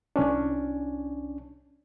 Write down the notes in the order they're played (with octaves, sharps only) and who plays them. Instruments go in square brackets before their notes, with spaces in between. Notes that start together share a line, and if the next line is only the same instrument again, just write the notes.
[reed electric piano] C2 C#4 D4